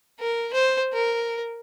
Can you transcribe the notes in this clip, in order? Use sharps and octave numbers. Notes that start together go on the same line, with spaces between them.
A#4
C5
A#4